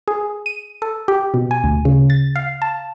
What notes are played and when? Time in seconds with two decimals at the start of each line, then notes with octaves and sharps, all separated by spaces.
0.08 G#4
0.46 D#7
0.82 A4
1.08 G4
1.34 B2
1.51 G#5
1.64 D2
1.85 C#3
2.10 A6
2.36 F5
2.62 A5